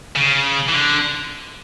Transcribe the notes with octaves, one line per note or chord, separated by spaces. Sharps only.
C#3
E3
D3